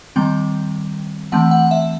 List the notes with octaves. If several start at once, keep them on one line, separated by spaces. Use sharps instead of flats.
D#3 G3 C4 G5
E3 A3 C4 F#5
F#5
E5